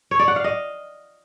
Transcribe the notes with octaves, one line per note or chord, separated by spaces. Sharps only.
C#5
D5
F#5
F5
D#5